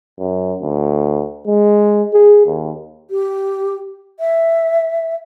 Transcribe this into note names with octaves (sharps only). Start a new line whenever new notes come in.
F#2
D2
G#3
G#4
D#2
G4
E5